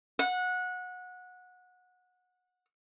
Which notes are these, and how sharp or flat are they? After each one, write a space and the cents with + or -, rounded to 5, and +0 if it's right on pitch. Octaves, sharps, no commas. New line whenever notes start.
F#5 -20